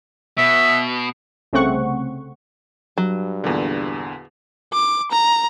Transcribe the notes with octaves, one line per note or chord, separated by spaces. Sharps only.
B2 E5
C2 C#3 A3 C4 F#5 C#6
G2 F#3
E2 A#2 D3
D6
A#5